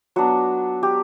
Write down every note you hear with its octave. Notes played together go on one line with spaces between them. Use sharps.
F#3 B3 D4 F#4
G4